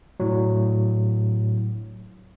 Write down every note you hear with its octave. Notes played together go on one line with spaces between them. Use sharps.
A2 F#3